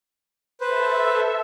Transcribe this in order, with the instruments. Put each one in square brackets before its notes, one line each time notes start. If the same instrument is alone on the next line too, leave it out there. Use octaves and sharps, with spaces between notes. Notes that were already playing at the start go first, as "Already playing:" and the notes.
[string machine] A4 E5 [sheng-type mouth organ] B4 C5